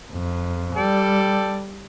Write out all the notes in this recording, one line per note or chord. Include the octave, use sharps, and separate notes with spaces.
F2
G3 A4 D5 G5